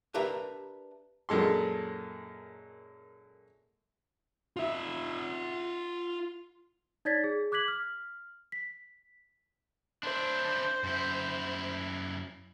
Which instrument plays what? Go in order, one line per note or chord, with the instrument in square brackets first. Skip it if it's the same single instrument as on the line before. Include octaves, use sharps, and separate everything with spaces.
[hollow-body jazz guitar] D4 G4 A#4 B4 E5 A#5
[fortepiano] F#2 A#2 G#3 A4 C6
[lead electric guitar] F4 E5
[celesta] D#4 C#5 D5 G#6 A6 B6
G#4
D6 F#6 G#6 B6 F#7
F6
B6
[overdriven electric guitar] D4 E4 [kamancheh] C5
[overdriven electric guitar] F#2 E4